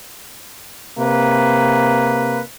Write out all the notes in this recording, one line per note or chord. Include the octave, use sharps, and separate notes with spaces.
C3 A#3 B4